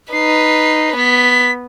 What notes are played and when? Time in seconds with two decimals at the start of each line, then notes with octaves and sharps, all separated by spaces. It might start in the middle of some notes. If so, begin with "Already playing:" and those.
0.13 D#4 B4 C7
0.96 B3 B6